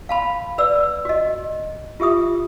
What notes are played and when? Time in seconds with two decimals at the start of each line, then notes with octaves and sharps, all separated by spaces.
0.09 F5 A5 B5
0.58 B4 D5 E6
1.05 F#4 D#5
2.00 F4 G4 E5 D#6